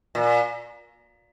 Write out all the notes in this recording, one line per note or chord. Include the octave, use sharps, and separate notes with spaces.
A#2